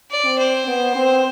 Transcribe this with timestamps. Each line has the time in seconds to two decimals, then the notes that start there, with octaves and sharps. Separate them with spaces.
0.10 D5
0.24 C4
0.38 C5
0.67 B3
0.95 C4